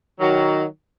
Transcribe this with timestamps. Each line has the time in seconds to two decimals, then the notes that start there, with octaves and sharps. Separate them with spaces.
0.20 D#3 F#3